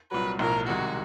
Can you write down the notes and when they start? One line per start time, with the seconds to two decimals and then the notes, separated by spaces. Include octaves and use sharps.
0.11 C2 A#2 F#3 B4
0.39 B1 A2 F3 A#4
0.67 C2 C3 D#3 G#3 F#4